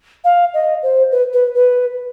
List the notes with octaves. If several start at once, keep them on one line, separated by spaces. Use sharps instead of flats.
F5
D#5
C5
B4
B4
B4